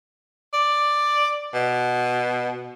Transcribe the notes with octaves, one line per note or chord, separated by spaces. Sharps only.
D5
B2